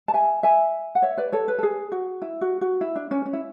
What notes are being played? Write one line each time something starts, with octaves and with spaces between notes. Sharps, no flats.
A5
E5 G#5
E5 G#5
F#5
C#5 E5
B4 D5
A4 C#5
B4
A4
G#4
F#4
E4
F#4
F#4
E4
D4
C#4
C#4
E4